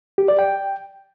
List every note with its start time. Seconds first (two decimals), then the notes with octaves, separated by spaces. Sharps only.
0.18 G4
0.28 D5
0.39 G5